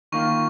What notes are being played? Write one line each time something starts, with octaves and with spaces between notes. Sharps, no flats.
D#3 A#3 F4 C#6